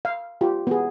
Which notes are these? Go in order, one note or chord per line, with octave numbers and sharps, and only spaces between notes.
F5
F4 G4
B3 G#4